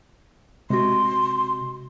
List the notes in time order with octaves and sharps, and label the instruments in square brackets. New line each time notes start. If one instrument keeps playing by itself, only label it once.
[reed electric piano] C3 [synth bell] G#3 F#4 [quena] C6